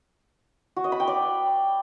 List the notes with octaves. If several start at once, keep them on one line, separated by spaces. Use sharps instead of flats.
F#4
D#5
B5
G5
D5